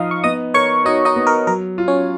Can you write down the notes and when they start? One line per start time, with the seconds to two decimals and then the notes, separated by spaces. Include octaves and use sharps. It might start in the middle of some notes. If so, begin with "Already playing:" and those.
Already playing: F3 D#4 D#5 F5 D#6
0.11 C#6
0.24 B3 D#5 D#6
0.54 A#4 C#5 C#6
0.85 D#4 F#4 D#5
1.05 D#4 D#5
1.16 B3
1.27 A#4
1.47 F#3 A#4
1.78 F4
1.88 C#4 C#5